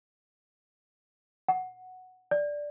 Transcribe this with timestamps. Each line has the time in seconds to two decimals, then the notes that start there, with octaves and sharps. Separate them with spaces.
1.48 F#5
2.31 D5